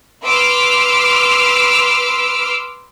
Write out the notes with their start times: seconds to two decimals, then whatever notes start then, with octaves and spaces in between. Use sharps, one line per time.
0.24 B4 C6 D6 E6 F6